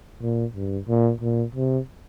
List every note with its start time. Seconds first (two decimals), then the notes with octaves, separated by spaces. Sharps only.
0.22 A#2
0.55 G2
0.88 A#2
1.21 A#2
1.55 C3